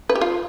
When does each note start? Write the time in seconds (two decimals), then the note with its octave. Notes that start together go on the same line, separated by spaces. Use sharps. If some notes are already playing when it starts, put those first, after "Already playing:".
0.09 B4
0.15 G4
0.21 F4